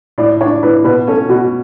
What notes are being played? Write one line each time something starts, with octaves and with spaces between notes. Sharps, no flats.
A2 D5
D4 C#5
A2 B4
B2 B4
C#4 A4
B2 F#4